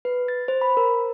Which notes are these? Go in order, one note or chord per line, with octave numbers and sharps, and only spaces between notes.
B4
A6
C5
B5
A#4